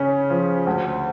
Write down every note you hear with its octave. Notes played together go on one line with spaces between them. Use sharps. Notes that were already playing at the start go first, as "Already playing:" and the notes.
Already playing: C#3 C#4
F3
D2